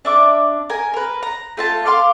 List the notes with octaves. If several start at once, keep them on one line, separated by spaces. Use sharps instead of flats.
D4 E5 D6
A#4 G#5
A#4 B4
A#5
A3 F4 A5
F5 C6 D6 F6